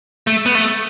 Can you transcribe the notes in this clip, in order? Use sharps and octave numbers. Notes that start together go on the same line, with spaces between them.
A3
B3
A3